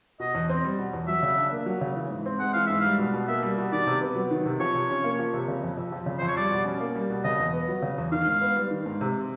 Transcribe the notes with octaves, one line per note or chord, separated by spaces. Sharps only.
B2 D#5
E2
C4
G3
B2
E2
F#3 E5
C#3
D4
A#3
F#3
C#3
E3
G#2
C4
G#3 F#5
E3 F5
G#2 E5
G3 F5
B2
B2
A#3 E5
G3
B2
D#3 D5
C3
B3
F#3
D#3
C3
F3 C#5
C3
C#4
A#3
F3
C3
C#3
F2
F2
F3
C#3
F2 C5
C#5
G3 D5
B2
C#4
A#3
G3
B2
C#3 D#5
E2
B3
F#3
C#3
E2
D#3 F5
G#2
B3
G3
D#3
G#2
C3